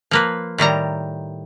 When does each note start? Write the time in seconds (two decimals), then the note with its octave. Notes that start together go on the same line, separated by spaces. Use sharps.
0.11 F3 A#3 B4
0.58 A2 D#3 G3 A#5